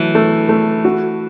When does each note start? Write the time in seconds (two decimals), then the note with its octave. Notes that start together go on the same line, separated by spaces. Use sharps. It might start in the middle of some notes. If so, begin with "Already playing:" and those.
Already playing: E3 F#3 A3
0.15 A3
0.49 A3
0.85 F#4